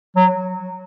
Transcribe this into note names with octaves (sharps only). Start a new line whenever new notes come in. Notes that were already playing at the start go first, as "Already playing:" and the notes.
F#3